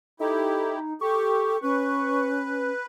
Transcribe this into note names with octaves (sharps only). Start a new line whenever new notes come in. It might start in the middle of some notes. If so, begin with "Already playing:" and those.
D#4 E4 G4 A4
G4 A4 C#6
C#4 B4